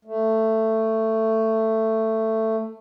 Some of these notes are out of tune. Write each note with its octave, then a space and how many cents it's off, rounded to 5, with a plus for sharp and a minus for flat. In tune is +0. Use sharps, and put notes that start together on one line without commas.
A3 +15